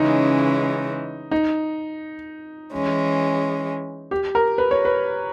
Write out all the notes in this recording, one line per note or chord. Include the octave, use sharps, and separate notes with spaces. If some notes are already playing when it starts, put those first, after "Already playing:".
Already playing: C#3 E3 G#3 C#4 D#4
D#4
E3 G#3 C#4
G4
A#4
B4
C#5
B4